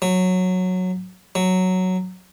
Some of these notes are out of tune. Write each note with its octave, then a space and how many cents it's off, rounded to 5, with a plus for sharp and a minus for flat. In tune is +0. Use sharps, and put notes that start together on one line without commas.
F#3 -10
F#3 +0